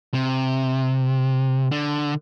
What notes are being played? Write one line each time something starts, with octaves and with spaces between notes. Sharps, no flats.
C3
D3